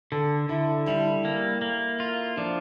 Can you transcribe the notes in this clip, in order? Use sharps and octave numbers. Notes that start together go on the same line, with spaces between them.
D3 A4
D3 E4
G3 E4
A#3
A#3
F4
F3 D4